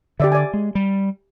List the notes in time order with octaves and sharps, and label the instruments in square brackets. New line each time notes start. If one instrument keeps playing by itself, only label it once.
[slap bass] D3 [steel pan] G4 D5 E5
[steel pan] D5 G#5
[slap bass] G#3
G3